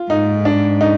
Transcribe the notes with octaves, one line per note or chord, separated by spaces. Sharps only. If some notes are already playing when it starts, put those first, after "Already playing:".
Already playing: F4
G#2 D#4
D4
D#4